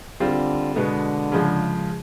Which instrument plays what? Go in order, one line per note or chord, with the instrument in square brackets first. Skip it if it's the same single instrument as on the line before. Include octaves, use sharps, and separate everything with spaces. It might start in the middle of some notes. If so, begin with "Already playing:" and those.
[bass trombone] D3 [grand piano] G3 C4 F4
[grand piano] B2 G#3 B3 [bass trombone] D3
[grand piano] C#3 F3 G#3